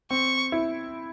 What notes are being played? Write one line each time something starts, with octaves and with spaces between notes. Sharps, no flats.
C4 C#6
E4